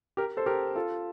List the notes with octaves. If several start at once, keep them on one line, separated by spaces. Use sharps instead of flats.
G4 A#4
A4 C5
G4 A#4
F4 A4